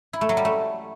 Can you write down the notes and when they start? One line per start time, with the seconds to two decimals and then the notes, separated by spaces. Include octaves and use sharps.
0.13 E4
0.21 A3
0.29 F#3
0.37 G3
0.45 A3